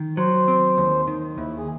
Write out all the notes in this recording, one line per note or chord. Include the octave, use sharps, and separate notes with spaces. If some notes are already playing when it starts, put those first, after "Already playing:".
Already playing: D#3
F#3 C5
C4
D#2
D#3
D#2 E4
G#4